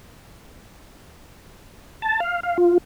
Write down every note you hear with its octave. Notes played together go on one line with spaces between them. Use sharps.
A5
F5
F5
F4